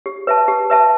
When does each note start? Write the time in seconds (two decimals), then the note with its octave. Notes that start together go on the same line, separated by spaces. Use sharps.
0.06 G4
0.27 B4 E5 A5
0.48 G4
0.70 B4 E5 A5